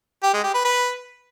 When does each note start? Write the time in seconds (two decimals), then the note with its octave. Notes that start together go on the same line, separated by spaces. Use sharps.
0.23 G4
0.34 G#3
0.44 G4
0.54 B4
0.65 B4